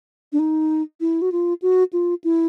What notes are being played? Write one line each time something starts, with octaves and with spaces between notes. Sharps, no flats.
D4
D#4
E4
F#4
F4
F#4
F4
E4